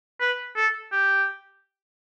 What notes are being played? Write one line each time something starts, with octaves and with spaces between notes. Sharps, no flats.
B4
A4
G4